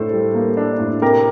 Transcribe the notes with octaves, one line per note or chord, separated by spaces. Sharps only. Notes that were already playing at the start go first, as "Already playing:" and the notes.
Already playing: A2 D4 A4 C5
G3
A#3
D4
A2
C3 G4 A#4